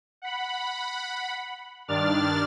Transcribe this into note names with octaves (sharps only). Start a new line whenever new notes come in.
F#5 B5
G2 D#3 D4 D5 F6 A6